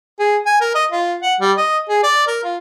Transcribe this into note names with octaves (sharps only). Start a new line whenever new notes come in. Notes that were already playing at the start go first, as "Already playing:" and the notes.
G#4
G#5
A#4
D#5
F4
F#5
G3
D#5
G#4
D5
A#4
F4